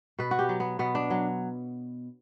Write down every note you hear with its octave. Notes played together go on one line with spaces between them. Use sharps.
B2 B4
F#4
G4
F#3
B3
B2 B3
D4
F#3